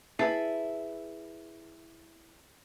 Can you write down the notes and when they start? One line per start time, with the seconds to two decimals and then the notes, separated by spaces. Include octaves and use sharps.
0.19 E4 G#4 B4 A5